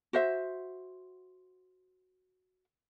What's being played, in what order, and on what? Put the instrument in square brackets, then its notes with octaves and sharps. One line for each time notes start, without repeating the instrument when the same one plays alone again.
[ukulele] F#4 C5 E5